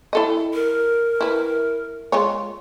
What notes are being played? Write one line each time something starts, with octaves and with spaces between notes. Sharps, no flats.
E4 A4 D#5
A#4
E4 B4
G#3 F4 C#5